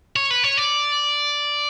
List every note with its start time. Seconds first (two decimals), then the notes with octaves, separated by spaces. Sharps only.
0.16 C#5
0.31 B4
0.44 C#5
0.57 D5